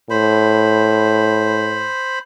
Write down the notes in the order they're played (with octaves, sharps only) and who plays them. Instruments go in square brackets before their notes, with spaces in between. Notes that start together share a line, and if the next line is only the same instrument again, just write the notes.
[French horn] A2 [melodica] C5 B5